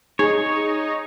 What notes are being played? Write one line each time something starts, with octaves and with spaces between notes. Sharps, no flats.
D#4 G#4 C#5